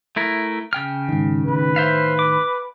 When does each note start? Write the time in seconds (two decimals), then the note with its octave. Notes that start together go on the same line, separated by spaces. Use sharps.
0.16 A3 E4 A#4
0.73 C#3 G5 F6
1.09 G#2 D#3
1.46 A2 D#3 B4
1.76 C5 E5 F5
2.19 D6